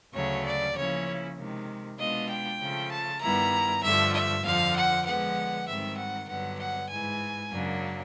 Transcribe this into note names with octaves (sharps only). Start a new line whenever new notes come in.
D2 C#3 F#3 A3 C#5
D5
C#3 F3 A#3 C#4 E4 C#5
C3 D#3 G#3
B2 G#3 B3 D4 F4 D#5
G5
C#3 F3 A3
A5
G2 D#3 G3 B3 E4 A#5
G2 D3 F3 A3 E5
E5
F2 D3 F3 F5
F#5
D3 F3 G#3 B3 F#5
G#2 D#3 G3 C4 E5
F#5
G2 D3 F#3 B3 F#5
F#5
G#2 E3 G#3 G#5
F#2 C#3 F#3 A#3 D4